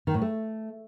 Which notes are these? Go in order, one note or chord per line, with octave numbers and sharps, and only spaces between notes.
D#3
A2
A3